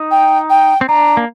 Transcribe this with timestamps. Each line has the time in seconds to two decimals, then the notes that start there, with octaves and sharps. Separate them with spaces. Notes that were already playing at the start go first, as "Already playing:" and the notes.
Already playing: D#4
0.11 G5
0.50 G5
0.81 C4
0.88 D4 A#5
1.17 A#3